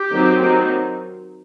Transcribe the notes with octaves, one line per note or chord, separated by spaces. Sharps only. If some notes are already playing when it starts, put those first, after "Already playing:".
Already playing: G4
D#3 F#3 C4 D#4
D#3 F#3 C4 D#4